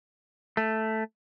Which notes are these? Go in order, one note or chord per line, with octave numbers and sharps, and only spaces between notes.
A3